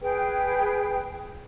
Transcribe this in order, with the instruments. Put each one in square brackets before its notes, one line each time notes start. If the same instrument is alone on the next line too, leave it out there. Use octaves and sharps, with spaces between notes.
[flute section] G#4 B4 G5